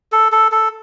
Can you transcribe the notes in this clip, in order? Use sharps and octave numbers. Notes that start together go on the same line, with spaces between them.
A4
A4
A4